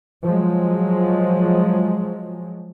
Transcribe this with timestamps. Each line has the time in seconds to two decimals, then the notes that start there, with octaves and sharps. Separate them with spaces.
0.24 F3 F#3 G#3